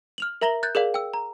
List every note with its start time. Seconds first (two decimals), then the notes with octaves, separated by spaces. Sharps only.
0.18 F6 F7 F#7
0.41 A#4 E5 A#5 A#6 F#7 G7
0.63 F#6 G6 A6
0.75 G#4 A#4 D5 F5
0.94 G5 E6
1.14 A#5